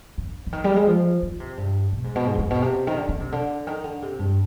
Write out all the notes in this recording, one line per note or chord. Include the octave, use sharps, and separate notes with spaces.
D3
D3
D#3
G3
G#3
F3
D#3
C3
G2
B2
G#2
B2
G#2
G2
G#2
B2
C3
D#3
D3
D3
C3
D3
D#3
D3
C3
G2